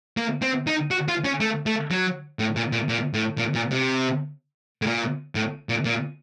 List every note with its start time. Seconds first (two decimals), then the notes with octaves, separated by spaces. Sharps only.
0.17 A#3
0.42 C4
0.67 D#4
0.91 F#4
1.08 F4
1.25 C#4
1.40 A3
1.66 A3
1.91 F#3
2.39 A2
2.56 A#2
2.72 A#2
2.89 A#2
3.14 A2
3.38 A#2
3.55 A#2
3.72 C3
4.82 A2
4.87 A#2
5.35 A2
5.69 A#2
5.85 A#2